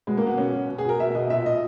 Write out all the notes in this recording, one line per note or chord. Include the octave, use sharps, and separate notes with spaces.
B2 G#3
B2 A#3
B3
B2 C#4
B2
B2
G#4
B2 A#4
B2 E5
B2 D#5
A#2 E5
A#2 D#5